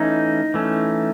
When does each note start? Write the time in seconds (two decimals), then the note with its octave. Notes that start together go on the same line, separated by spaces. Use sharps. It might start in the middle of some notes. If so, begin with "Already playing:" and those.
Already playing: E3 A3 C#4 D#4
0.54 E3 A3 C#4